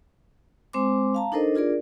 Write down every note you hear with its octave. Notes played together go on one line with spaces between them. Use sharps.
G#3 C4 C5 G#5 C6 D6
F5 A5 A#5
D4 D#4 A4 A#4 C5 D#5
D4 F4 G#4 A#4 D5